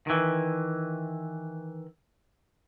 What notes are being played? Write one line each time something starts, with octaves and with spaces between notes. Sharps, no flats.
D#3 E3